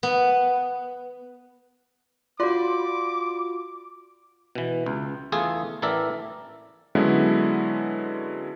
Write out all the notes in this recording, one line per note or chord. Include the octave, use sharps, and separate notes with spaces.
B3
F4 F#4 D5 B5 C6 D6
B2 E3
C#2
E2 A3 F4 G#4 A4
A1 E3 A4 A#4 D5 E5
D3 F#3 G#3 B3 C#4 E4